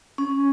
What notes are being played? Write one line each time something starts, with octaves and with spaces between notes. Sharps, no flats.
C#4